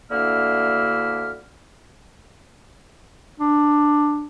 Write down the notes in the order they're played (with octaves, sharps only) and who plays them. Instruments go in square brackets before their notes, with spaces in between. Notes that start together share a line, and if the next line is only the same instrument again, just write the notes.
[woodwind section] D2 D3 A#3 E4 F6
[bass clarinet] D4